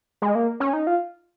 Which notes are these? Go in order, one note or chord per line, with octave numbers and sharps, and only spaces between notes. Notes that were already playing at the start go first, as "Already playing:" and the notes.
G#3
A#3
C#4
D#4
F4